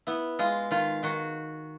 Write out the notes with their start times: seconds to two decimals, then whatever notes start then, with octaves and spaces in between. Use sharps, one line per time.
0.07 B3 E4
0.39 G#3 F4
0.71 D#3 F4
1.03 D#3 F#4